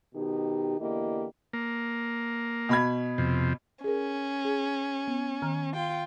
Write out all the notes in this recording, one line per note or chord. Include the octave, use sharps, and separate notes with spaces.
B2 D#3 D#4 G4
E2 D3 A#3 E4 G4 D#5
A#3
B2 B5 G#6
F2 C3
C#4 G#4 A#4
G#4
B3
D#3 A#5 F6
F4 G5